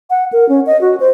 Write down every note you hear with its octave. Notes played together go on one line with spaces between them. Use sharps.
F#5
A#4
C#4
D#5
F#4
C5